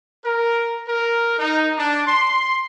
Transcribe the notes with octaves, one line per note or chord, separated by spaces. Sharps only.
A#4
A#4
D#4
D4
C6